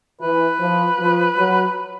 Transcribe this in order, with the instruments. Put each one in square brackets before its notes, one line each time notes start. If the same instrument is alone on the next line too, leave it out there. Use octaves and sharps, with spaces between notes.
[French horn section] E3 [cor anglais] B4
[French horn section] F3
F3
F#3